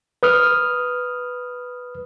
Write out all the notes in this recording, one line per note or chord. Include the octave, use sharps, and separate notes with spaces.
B4 D#6 F6